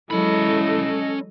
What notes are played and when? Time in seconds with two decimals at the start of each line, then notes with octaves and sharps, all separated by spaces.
0.11 E3 F#3 G#3 C#4 E4 A4 D#5 B5